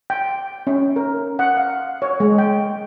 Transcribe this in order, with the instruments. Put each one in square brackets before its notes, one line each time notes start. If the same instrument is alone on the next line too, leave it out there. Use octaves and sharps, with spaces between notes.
[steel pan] G5
C#4
A#4
F#5
F5
C#5
G#3
G5